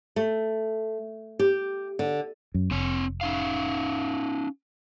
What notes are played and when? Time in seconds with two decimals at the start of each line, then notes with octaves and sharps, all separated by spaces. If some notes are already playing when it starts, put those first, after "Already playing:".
0.16 A3
1.39 G4
1.99 D3
2.54 F#2
2.71 F1 C4 C#5
3.21 C#4 D#4 F5